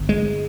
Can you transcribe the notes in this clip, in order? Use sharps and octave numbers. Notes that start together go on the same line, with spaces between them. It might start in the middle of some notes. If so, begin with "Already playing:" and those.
Already playing: G1 G2
G#3